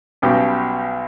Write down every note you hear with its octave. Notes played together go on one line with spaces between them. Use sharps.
B1 B2 G3 C#4 G4